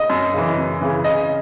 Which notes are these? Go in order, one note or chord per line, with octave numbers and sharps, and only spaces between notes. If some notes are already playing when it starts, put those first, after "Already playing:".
Already playing: D#5
F#2
C#3 E3
F#2
C#3 E3
C#3 D#5